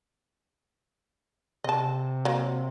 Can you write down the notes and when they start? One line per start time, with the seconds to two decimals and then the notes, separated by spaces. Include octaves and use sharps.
1.64 C3 D#5 A5
2.25 F#3 A#3